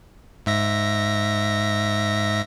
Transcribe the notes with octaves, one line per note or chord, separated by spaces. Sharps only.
G#2 E5 A#6